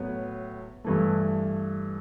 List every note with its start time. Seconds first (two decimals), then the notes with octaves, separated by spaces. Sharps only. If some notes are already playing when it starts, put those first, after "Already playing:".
Already playing: A2 F#3 B3
0.84 G2 E3 A3